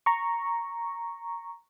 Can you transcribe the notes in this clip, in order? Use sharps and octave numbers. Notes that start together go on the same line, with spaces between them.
A#5 C#6